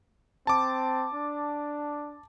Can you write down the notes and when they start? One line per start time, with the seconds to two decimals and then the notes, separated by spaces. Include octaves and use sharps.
0.47 C4 A5 D6
1.14 D4